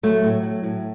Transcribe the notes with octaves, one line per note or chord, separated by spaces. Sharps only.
F#3 A3
A2
F#3
A2